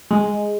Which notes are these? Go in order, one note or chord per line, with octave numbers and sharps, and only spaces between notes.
G#3